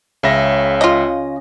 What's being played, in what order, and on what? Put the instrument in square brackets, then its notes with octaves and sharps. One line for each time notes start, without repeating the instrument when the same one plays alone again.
[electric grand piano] C#2 E5 A#6 [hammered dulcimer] C#3
[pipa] F4 D#5